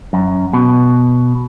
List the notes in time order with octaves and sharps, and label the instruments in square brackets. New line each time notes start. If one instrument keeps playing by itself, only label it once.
[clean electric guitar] F#2
B2